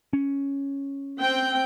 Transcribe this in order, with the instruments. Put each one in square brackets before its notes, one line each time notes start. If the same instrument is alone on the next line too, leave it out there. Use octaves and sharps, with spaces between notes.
[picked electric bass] C#4
[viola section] C4 G5